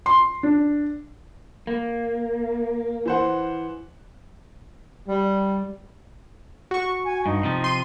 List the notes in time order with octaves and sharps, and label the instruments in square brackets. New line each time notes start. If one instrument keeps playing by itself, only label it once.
[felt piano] C6
D4
[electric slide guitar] A#3
[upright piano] E3 C5 F#5
[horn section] G3
[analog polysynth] F#4 C#6
[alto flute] G#5
[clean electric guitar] G2 [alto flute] D#4
[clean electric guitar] C3 F3
[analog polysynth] C6 D#7